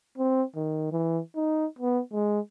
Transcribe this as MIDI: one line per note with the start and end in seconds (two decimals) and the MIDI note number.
0.18 0.43 60
0.56 0.88 51
0.92 1.19 52
1.36 1.66 63
1.79 2.00 59
2.13 2.40 56